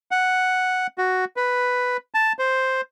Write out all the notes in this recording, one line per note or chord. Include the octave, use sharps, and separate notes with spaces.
F#5
F#4
B4
A5
C5